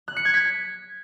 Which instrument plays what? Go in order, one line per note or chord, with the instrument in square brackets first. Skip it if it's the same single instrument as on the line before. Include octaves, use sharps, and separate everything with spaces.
[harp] F#6
C#7
G#6
B6